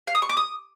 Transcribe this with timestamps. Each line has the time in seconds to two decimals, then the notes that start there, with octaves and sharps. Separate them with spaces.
0.07 F5
0.15 D#6
0.22 C#6
0.29 D6
0.37 D#6